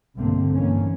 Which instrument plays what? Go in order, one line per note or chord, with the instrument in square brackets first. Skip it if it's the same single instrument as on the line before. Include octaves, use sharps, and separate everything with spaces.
[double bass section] B1 G2 D3 A3 A#3 C4
G2 D#3 E3 A#3 C#4